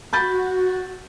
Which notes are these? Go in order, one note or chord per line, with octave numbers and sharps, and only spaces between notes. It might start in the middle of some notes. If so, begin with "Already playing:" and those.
F#4 B5 G6 A6